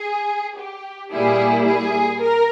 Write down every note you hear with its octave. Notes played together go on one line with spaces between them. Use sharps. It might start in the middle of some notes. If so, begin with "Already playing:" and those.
Already playing: G#4
G4
A#2 G3 A#3 E4 G#4
G#4
A#4